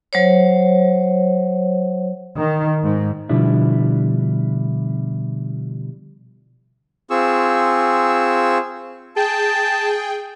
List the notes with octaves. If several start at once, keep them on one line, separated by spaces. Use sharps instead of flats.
F#3 C5 C#5
D#3
G#2
B2 D3 F3 G3 D4 E4
C4 F4 G#4 C#6 E6
G#4 G5 A5